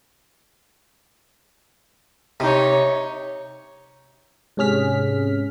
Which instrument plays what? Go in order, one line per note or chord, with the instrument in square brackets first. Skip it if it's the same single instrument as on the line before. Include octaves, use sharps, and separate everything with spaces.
[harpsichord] C3 [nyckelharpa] D#4 C#5
[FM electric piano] G#2 C3 C#4 G#4 F6 B6